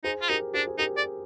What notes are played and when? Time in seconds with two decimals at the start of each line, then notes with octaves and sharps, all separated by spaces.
0.04 D#4 G#4 C5
0.22 F4
0.29 D#4 G4 A#4
0.54 D4 G#4 C5
0.67 G#4
0.79 D#4 G4 A#4
0.97 D5